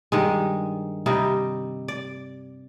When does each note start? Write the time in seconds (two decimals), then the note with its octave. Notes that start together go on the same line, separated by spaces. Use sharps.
0.12 G2 D#3 G#3
1.06 C3 G3 D#4
1.88 D5